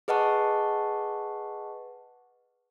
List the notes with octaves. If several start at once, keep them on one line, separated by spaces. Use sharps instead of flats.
G#4 B4 D#5 F#5 A5 C#6